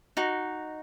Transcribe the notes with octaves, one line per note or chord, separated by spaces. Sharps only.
D#4 F#4